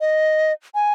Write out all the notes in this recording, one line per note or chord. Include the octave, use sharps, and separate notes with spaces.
D#5
G#5